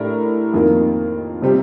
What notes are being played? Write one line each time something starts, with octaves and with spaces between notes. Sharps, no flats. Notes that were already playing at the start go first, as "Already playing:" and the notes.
Already playing: A2 A3 D4 G4 A#4
F2 D#3 A#3
C3 G3 C4 G4